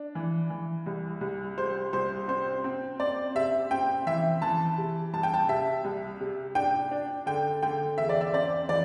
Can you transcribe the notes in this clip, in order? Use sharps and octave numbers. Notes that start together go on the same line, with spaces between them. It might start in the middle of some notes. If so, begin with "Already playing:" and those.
Already playing: D4
E3
E3
C2
C2
G3 C5
C2 C5
C4 C5
C4
C4 D5
C3 E5
C4 G5
E3 E5
E3 A5
C3
C2 A5
G5
A5
C3 E5
C2
C3
D4 G5
D4
D3 G5
D3 G5
E2 E5
D5
E5
C4 D5
E3 D5